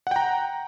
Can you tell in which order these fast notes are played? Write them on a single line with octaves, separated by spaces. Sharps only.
F#5 G5 A#5